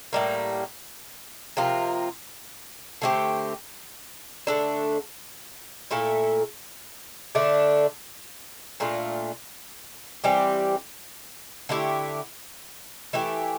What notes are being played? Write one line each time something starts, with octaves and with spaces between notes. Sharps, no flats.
A2 G3 A#3
C3 F3 A#3 F4
D3 A3 C4 G4
D3 A3 D4 A4
A#2 A3 E4 A4
D3 A3 D4
A#2 A3 D4 F4
E3 G3 C4 G4
D3 A3 E4 G4
E3 A3 E4 G4